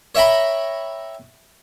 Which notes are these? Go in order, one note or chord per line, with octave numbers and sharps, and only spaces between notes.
C#5 E5 G5 A#5 B5